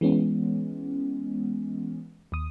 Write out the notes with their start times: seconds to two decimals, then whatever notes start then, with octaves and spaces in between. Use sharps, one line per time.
0.01 E3 G#3 B3 C#4
2.32 D#2 D#6